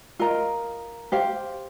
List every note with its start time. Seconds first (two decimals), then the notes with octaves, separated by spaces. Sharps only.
0.19 F4 A#4 D#5 A#5
1.12 G4 C5 F5